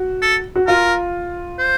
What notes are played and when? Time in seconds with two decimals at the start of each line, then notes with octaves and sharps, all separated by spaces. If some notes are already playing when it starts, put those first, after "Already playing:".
Already playing: F#4
0.22 A4
0.56 F#4
0.67 F4 A#4
1.59 C5